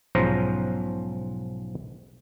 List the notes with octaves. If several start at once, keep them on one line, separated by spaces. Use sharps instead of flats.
B1 G#2 F3 C#4 C5 A#5